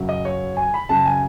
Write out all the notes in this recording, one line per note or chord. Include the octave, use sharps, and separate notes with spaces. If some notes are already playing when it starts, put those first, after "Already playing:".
Already playing: F#2 C#3 F#3
D#5
C#5
G#5
B5
F#2 C#3 F#3 A5
G#5